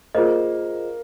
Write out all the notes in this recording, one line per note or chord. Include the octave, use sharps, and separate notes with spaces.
A#3 F4 G#4 C5 D#5